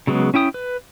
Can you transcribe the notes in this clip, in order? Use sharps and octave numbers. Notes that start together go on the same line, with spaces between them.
C#3 F#3 G#3 B3
C#4 E4 G5 D#6
B4